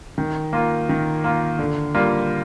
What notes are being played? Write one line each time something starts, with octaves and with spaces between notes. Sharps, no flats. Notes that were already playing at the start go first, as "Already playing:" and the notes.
D#3
A#3 F4
D#3
A#3 F4
D3
G3 A#3 F4